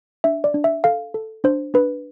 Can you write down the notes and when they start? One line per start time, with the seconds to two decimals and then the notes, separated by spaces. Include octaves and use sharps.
0.24 D4 E5
0.44 D5
0.54 D4
0.64 E5
0.84 A4 F5
1.14 A4
1.44 D4 C5
1.74 D4 B4